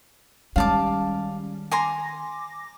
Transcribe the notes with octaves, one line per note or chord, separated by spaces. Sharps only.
D#3 G3 G#3 C#4 F5 A5 D6
G#5 A#5 C6 D6 A#6